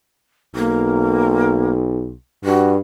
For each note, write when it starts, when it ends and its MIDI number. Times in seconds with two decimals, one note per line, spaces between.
0.55 2.14 35
0.55 1.72 58
2.44 2.78 43
2.44 2.71 66